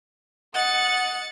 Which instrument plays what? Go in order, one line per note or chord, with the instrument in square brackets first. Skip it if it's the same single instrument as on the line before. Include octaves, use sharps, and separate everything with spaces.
[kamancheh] D#5 [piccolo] F#5 [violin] A6 C#7